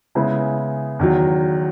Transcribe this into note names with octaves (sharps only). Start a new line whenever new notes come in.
C#3 G#3 B3 E4 G#4
E2 D#3 F#3